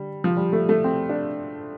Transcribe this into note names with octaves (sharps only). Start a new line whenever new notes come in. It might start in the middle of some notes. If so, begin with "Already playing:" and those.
Already playing: D3 G3
F3
G3
A3
A3
C4
D4